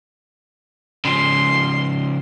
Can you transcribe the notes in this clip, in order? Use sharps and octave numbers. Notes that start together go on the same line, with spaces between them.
C#3 F3 C6